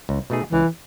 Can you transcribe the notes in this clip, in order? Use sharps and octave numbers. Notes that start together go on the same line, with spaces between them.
C#2
B2 A3 D#4 G#4
C#2 E3